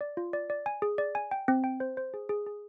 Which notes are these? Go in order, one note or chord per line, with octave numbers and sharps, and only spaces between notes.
D5
F4
D5
D5
G#5
G#4
D5
G#5
G5
C4
G5
C5
C5
G#4
G#4
G#4